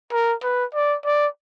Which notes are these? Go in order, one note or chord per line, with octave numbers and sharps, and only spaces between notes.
A#4
B4
D5
D5